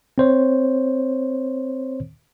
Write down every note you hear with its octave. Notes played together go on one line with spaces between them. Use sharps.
C4 C5 C#5